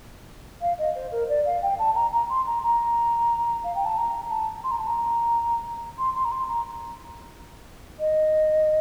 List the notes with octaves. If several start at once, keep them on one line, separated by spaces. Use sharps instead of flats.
F5
D#5
C5
A#4
D5
F5
G5
A5
A#5
A#5
C6
A#5
A#5
F5
G5
A5
A#5
A5
C6
A#5
A5
A#5
C6
C6
A#5
C6
A#5
D#5